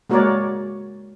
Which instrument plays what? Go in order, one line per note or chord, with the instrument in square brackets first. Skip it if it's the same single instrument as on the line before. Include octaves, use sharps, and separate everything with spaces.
[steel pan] G#3 A#3 F#4 A#4 C#5 D5